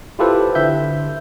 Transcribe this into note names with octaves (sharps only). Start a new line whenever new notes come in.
E4 F4 G4 A4 B4 C5
D3 E5 G6